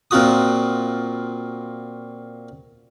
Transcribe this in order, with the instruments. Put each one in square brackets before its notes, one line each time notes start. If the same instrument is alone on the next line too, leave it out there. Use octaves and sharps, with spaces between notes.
[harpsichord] A#2 C4 F4 F#4 D#6